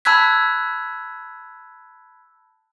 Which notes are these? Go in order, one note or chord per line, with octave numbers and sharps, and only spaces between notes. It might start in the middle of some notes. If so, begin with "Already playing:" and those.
A5 B5 E6 F#6 G#6 B6